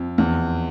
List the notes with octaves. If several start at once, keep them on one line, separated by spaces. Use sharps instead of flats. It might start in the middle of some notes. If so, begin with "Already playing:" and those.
Already playing: F2
E2